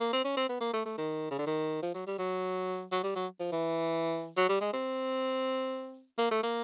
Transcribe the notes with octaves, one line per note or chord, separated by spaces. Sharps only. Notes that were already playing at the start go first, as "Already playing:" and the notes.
A#3
C4
C#4
C4
B3
A#3
A3
A3
D#3
C#3
D3
D#3
F3
F#3
G3
F#3
F#3
G3
F#3
F3
E3
F#3
G3
G#3
C4
A#3
A3
A#3